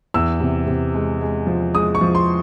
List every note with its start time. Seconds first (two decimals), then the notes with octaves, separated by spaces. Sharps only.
0.14 E2 E6
0.40 C3
0.67 C3
0.94 G#3
1.21 G#3
1.47 F3
1.75 G#3 D#6
1.95 C#6
2.01 F3
2.15 C6